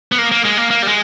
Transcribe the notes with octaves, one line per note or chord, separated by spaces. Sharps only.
B3
A#3
A#3
G#3
A#3
A#3
G3
G#3